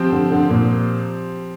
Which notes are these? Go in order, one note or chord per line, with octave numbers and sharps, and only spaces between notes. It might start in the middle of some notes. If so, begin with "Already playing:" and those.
Already playing: F3 C4 G4 C5
D3
D3
A#2